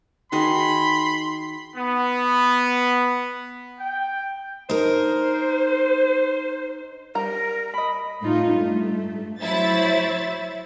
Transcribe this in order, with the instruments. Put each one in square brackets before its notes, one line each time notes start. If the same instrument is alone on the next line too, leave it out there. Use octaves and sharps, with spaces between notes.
[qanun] D#3 F#4 G#4 [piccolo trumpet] B5 [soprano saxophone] C6
[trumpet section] B3
G5
[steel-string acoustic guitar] D#4 A#4 [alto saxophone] C5
[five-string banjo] G3 A#5 [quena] A#4
[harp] D#5 B5
[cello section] A2 D#4 F4
G2 A3
[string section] F#3 E4 A6 [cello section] C5 C#5 E5